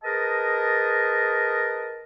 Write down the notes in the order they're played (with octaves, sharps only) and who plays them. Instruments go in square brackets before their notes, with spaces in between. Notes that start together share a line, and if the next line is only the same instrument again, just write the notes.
[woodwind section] G#4 A#4 B4 D#5 A5